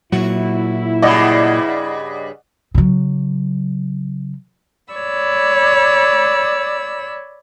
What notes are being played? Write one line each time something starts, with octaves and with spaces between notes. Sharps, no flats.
A#2 F#3 E4 F#4
G2 C#3 D5 D#5 F#5
C#3 F#3
C#5 D5 B5 E6